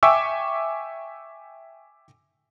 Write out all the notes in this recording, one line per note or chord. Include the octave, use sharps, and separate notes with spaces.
E5 G5 G#5 C#6 D6 E6